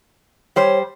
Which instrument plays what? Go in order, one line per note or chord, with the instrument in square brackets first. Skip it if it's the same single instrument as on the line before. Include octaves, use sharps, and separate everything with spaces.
[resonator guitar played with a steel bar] G3 C5 [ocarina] C#5